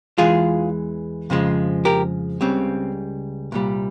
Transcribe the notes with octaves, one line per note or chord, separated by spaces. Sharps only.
E2 E3 G#3 F4 G#4
F2 C#3 F3 G#3
G4 A#4
C#2 C#3 G3 C4
C2 A#2 G3